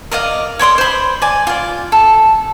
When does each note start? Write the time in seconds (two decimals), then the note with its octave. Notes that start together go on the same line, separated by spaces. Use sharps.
0.11 A#4 D5 D#5 F5
0.59 C#5 D5 C6 D#6
0.78 C5 B5
1.22 D5 G#5
1.47 F4 D5
1.92 A4